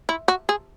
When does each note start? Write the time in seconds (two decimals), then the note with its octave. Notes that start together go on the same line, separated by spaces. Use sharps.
0.09 E4
0.28 F#4
0.49 G#4